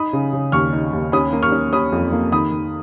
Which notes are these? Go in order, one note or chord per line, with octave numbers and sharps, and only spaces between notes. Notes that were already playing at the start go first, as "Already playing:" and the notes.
Already playing: D#4 B5 D#6
C#3
C#3
D#2 C#6 F6
D#4
D#2
C#4 B5 D#6
A#3
C#6 F6
C#4
C#4 B5 D#6
F2
A#3
D#3 B5 D#6
D#3